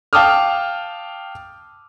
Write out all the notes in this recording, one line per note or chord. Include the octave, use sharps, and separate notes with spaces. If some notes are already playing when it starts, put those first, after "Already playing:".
F5 G5 A5 D6 D#6 F6